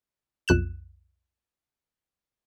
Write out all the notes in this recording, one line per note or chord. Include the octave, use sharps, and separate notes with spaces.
B1 F2 F#6 E7